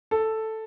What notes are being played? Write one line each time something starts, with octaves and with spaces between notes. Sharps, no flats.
A4